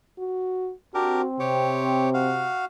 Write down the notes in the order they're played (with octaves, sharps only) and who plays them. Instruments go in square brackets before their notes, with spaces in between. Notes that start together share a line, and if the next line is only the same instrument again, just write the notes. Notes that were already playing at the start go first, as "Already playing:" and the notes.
[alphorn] F#4
[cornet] C4 [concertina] D4 G4 A#4 [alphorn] F#4
[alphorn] C3 [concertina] G4 C#5
[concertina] F#4 F5